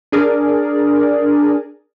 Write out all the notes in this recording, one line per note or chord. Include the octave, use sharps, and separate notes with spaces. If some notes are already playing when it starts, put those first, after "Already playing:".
D4 G#4 A#4 D5